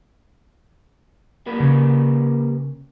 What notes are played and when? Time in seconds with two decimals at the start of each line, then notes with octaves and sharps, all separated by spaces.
1.46 G3 A#3 B4
1.60 C#3